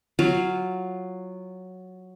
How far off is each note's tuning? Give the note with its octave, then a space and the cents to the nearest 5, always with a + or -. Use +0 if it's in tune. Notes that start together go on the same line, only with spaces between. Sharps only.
F#3 -5 F4 +0